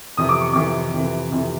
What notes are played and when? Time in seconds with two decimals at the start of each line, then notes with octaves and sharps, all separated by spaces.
0.17 F2 C3 E3 D#6
0.29 D6
0.41 C#6
0.53 F2 C3 E3 D6
0.94 F2 C3 E3
1.32 F2 C3 E3